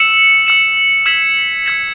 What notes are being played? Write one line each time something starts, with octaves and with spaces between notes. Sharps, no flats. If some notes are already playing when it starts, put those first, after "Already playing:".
Already playing: E6 C#7 E7
E6 C#7 E7
E6 G#6 B6 E7
E6 G#6 B6 E7